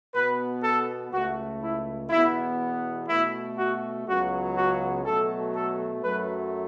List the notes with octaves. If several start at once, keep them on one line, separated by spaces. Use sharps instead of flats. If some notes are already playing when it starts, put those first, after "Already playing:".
B2 B3 B4
A4
C#2 C#3 A3 F#4
E4
E2 B2 B3 E4
B2 A3 E4
F#4
C#2 C#3 F#3 B3 F#4
F#4
B2 F#3 A3 A4
A4
F#2 F#3 A3 B4